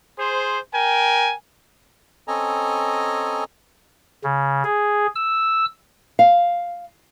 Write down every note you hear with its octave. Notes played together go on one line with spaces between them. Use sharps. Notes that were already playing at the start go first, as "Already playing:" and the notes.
G#4 C5
A#4 G5 G#5
C4 C#4 A4 D#5 G#5 A#5
C#3
G#4
E6
F5